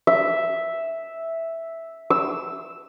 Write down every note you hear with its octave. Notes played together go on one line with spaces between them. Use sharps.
E5
E6